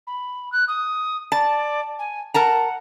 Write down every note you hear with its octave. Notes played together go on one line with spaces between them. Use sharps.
B5
F#6
D#6
D5 A5
G#5
A#4 F#5 A5 A#5